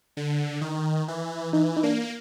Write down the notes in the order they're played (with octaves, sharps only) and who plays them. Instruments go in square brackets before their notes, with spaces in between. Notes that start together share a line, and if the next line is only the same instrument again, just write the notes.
[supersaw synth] D3
D#3
E3
[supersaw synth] E3 [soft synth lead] D#4
[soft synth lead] D#4
[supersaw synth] A#3 [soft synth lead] D4